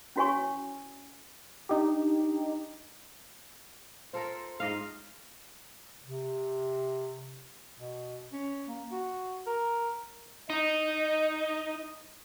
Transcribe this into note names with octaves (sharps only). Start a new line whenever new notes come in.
C#4 E4 F#4 C#5 G#5 C#6
D4 D#4 G4
F4 A4 A#4 C5
G#2 D#5 F5
C3
B2
C#4
A#3
F#4
A#4
D#4 D#5